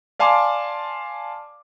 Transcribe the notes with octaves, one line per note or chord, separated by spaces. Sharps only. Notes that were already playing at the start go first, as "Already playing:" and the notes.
D5 F5 G#5 A5 C6 D6